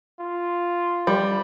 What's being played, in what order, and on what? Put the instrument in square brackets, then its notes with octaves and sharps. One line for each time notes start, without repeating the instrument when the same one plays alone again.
[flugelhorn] F4
[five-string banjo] G3